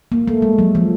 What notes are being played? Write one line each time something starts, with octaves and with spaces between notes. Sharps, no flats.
A#3
A3
G#3
F#3
F3